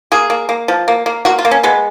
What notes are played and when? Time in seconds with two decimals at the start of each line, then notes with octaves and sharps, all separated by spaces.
0.12 A#3 G#4
0.30 A#3
0.49 A#3
0.68 F3
0.88 A#3
1.06 A#3
1.25 A#3 F#4
1.39 F4
1.45 A#3
1.51 C#4
1.63 G#3 B3